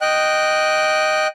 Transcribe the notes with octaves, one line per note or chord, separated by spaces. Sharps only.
D#5 G5 F#6